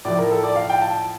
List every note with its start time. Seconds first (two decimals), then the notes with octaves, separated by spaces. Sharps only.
0.05 A2 F3 D5
0.18 A#4
0.31 A4
0.43 D5
0.56 F5
0.70 G5
0.82 A5